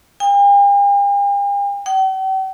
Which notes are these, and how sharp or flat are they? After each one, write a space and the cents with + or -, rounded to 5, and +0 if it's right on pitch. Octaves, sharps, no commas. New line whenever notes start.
G5 +45
G5 -45